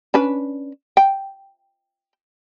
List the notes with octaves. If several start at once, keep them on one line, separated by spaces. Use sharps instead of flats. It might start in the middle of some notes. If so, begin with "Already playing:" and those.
C#4 D4 B4
G5